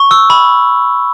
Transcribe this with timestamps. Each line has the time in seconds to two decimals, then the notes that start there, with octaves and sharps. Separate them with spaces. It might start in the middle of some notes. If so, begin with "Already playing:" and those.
Already playing: C#6
0.11 E6
0.30 B5